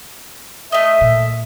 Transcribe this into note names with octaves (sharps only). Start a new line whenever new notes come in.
A3 D#5 E5
A#2